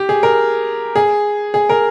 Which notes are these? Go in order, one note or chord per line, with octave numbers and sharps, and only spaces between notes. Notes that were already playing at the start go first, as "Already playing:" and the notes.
Already playing: G4
G#4
A#4
G#4
G#4
A#4